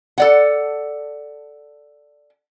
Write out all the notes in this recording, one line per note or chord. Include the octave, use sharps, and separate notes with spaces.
A4 D5 F#5